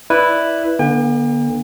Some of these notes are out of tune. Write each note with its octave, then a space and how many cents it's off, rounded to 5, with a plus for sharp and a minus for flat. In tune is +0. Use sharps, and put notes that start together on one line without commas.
E4 +0 B4 +0 D5 +0
D3 +0 B3 -45 G5 +45